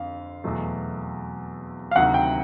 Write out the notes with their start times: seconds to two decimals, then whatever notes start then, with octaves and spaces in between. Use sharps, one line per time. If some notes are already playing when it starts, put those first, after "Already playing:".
Already playing: F2 D3 F5
0.44 E2 B2 F#3 A3
1.91 F5
1.96 D2 C3 D#3 F#3 F#5
2.14 G5